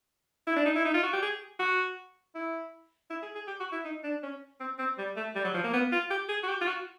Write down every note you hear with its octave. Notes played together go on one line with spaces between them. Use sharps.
E4
D4
D#4
E4
D#4
F4
F#4
G4
G#4
F#4
E4
E4
G#4
G#4
G4
F#4
E4
D#4
D4
C#4
C4
C4
G3
A3
G3
F#3
F3
A#3
B3
F4
G4
G#4
F#4
G4
F4
F#4